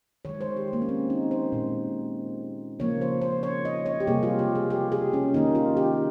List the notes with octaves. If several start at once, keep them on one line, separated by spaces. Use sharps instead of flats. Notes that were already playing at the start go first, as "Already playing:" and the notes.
D#3 G#3 C#5
C5
G4
A#3
C#4
C4
D#4
C5
A#2 G#3
C#3 F3 A#3 C#5
C5
C5
C#5
D#5
C#5
G4
C3 G3 A#3 G#4
F4
G4
G#4
G4
G#4
C#4
D#3 A#3 D#4
F4
G4